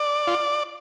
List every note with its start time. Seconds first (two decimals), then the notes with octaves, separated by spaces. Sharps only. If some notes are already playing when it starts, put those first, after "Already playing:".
Already playing: D5
0.27 F4